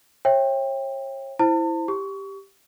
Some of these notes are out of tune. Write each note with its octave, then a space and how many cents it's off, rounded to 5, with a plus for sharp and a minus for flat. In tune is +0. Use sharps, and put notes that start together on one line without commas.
C#5 -40 E5 +0 G5 +15
E4 +0 C5 +0 A5 +40
G4 +0 C#6 +30